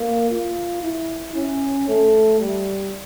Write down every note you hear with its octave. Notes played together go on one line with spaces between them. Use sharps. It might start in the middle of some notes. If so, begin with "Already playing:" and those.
Already playing: A#3
F4
E4
C#4
A3
G3